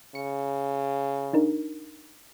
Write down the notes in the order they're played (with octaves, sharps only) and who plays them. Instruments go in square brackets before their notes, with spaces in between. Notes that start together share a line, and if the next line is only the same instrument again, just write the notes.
[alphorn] C#3 [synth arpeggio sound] C#7
[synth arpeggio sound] D4 D#4 A#4